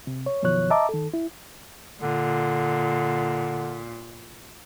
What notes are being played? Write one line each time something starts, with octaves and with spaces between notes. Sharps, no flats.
C3
C#5
F#2 B2 D#3 F3 C#5 F#6
D#5 E5 A5 A#5 D6
D#3 A4
E4
A#2 D3